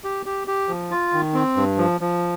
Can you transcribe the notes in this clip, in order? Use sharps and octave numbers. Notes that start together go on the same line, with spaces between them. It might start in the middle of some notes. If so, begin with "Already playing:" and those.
G4
G4
G4
F3
F4
D#3
C4
G2
F3
F3